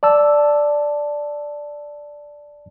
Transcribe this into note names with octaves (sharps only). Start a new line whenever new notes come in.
D5 A5 E6